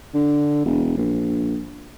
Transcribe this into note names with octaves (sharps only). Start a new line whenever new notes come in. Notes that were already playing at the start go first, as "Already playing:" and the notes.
D3
E1
A#1